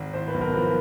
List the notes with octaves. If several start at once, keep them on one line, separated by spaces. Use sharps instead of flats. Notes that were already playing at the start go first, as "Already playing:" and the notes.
Already playing: G#1
A2 C5
B4
B1
A#4
F3 B4